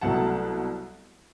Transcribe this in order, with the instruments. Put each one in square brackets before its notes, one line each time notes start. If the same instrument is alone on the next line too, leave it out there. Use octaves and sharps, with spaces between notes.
[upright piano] C2 B2 F#3 A3 F#5 A5